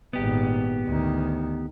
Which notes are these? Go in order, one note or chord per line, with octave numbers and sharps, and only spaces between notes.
G#1 A#2 B3 G4
D2 D#3